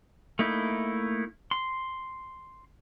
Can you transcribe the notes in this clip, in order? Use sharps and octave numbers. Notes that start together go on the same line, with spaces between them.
A3 A#3 D#4 E4
C6